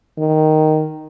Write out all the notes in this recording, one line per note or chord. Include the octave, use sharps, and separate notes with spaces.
D#3